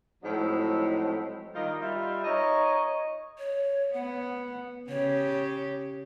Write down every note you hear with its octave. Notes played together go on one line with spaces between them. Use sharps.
A2 F3 F#3 G#3 C4 D#4
D#3 G3 A#3 F4 D#5
G3 F4 E5
D#4 A#4 C#5 D#5
C#5
B3 F#5
C#3 G4 C#5